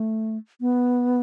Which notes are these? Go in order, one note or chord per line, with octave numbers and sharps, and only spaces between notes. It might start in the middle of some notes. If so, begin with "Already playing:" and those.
Already playing: A3
B3